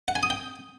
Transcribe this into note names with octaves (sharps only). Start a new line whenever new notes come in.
F#5
G#5
D#6
G5